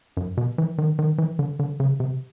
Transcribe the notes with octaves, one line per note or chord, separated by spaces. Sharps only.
F#2
B2
E3
D#3
D#3
E3
D3
D3
C#3
C3